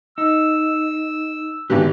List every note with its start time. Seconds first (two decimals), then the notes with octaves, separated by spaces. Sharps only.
0.18 D#4 E6
1.70 G#1 B2 D3 G#3 G4 B4